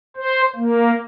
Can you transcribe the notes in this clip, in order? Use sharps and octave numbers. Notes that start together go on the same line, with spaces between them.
C5
A#3